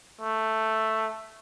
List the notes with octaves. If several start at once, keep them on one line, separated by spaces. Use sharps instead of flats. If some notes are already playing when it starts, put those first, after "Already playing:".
A3